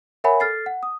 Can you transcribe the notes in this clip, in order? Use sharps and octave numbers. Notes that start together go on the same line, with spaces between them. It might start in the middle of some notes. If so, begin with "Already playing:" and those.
A#4 C#5 E5 F#5 G#5 B5
A4 F6 A6 C7
F#5
D#6